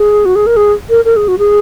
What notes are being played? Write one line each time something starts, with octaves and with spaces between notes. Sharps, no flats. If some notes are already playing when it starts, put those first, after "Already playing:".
Already playing: G#4
F#4
G#4
A#4
G#4
A#4
A#4
G#4
F#4
G#4